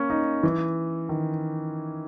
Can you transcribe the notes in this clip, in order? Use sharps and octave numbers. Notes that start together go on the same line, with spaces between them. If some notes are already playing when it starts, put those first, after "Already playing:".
Already playing: A#3 C#4
D#4
E3
D#3